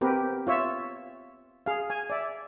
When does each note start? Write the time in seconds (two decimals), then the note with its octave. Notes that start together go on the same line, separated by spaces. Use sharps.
0.01 B3 C4 G4 A#4 B4
0.47 F4 C#5 E5
1.66 G#4 F5
1.90 G#5
2.10 D5 E5